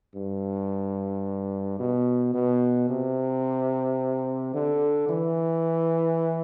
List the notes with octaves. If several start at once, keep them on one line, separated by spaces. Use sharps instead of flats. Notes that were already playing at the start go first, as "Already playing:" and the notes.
G2
B2
B2
C3
D3
E3